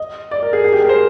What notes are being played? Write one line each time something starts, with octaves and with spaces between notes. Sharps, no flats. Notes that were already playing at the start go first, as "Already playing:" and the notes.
Already playing: D#5
D5
A#4
G#4
G#4
G4
G#4
A#4
C5